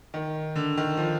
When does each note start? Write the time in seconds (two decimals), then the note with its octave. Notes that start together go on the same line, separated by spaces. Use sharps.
0.14 D#3
0.56 D3
0.77 D#3
0.97 F3